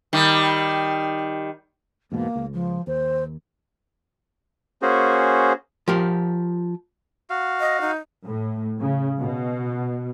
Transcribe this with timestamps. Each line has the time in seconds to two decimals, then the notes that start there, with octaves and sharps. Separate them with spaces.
0.13 D#3 G3
2.12 E2 G#2 B2 A#3
2.36 C#2
2.53 F3
2.87 D#2 C5
4.82 A#3 C#4 F#4 G#4 C5
5.88 F3 G4 A#4
7.30 F#4 F5
7.60 D#5
7.81 D#4
8.26 A2
8.80 C#3
9.19 B2